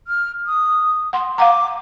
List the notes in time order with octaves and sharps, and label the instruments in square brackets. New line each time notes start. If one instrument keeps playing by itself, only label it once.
[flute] F6
D#6
[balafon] F#5 C6
[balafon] F5 F#5 A#5 [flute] D6